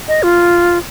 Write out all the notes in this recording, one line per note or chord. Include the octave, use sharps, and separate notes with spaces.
D#5
F4